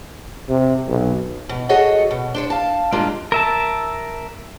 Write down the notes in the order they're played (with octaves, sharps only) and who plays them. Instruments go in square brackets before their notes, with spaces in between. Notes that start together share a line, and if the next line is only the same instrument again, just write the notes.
[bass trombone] C3
B1
[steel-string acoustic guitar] B2
F#4 G#4 A4 C#5 D#5 F#5
B2
D4 C5 C#5
F5 A5
G3 G#3 A#3 D4 F4
[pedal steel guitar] A#4 E5 A5